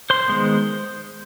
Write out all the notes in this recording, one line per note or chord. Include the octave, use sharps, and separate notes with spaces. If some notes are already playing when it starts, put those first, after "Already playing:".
C5 C6
D#3 G#3 B3